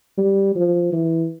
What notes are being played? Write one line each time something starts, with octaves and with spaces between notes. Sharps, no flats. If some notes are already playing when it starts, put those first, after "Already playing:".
G3
F3
E3